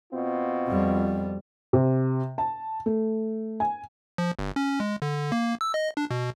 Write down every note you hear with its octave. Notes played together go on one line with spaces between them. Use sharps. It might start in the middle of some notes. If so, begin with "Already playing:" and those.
B2 C4 F4
F2 G3
C3
A5
A3
G#5
F3
G1
C#4
G#3
D3
A#3
E6
D#5
D4
B2